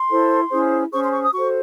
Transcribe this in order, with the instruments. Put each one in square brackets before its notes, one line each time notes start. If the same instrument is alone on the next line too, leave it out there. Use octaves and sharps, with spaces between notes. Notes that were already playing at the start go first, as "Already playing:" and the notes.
Already playing: [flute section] C6
E4 A4 C5
C#4 E4 G#4 C5
C#4 G#4 C5 C#6
C6
C#6
D#6
F#4 A4 C5 C#6